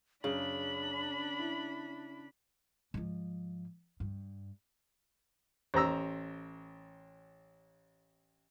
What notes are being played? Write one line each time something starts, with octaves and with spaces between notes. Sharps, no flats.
F#2 C#3 D4 B5 F#7
E4
G#2 F3
G2
A1 C5 A#5 E6